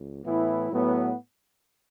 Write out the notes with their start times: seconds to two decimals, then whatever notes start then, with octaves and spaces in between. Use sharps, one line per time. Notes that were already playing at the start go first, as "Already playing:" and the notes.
Already playing: C#2
0.25 A2 E3 B3 E4
0.70 A2 F#3 B3